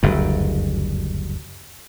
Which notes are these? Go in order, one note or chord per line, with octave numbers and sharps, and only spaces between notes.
F#1 D2 G2